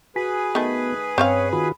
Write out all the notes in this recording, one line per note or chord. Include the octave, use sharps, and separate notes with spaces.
F#4 G#4 B4 G#5 B6
D#3 A3 B3
G2 C4 C#4 C#5 F5
D#3 F4 F#4 B5